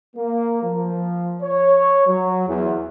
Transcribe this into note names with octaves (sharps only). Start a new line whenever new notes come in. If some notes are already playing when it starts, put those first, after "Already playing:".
A#3
F3
C#5
F#3
E2